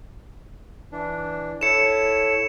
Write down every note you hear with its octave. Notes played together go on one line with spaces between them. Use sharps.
E3 D4
E4 A4 C#5 C#7 E7